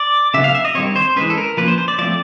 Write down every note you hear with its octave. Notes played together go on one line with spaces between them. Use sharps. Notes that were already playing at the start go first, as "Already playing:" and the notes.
Already playing: D5
C#3 F#3 B3 E5
F5
E5
D#5
D#3 G3 C4 C#5
C5
E3 G#3 C#4 B4
A4
A#4
F3 A#3 C#4 B4
C5
C5
D5
F3 A3 C4 D5